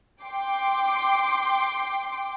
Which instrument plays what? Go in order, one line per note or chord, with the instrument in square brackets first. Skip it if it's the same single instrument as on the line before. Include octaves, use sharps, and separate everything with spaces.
[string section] G5 C6 D6